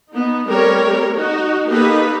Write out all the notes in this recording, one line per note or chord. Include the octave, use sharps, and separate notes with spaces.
B3 D#4
G3 A3 C4 A#4 C#5
D#4 F#4
A#3 B3 D#4 G4 A4 B4